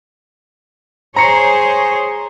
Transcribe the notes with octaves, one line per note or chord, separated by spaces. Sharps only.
G#4 C5 C#5 A#5 C#7